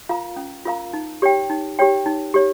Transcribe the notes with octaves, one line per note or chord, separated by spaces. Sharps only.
F4 A#4 F5 A#5
C#4
F4 A#4 F5 A#5
D#4
G4 C#5 G5
D#4
G4 C#5 G5
D#4
G4 C#5